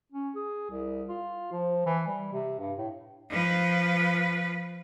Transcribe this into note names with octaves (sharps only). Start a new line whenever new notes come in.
C#4
G#4
C2
F4
F3
E3
G3
C3
G2
A2
F3 B4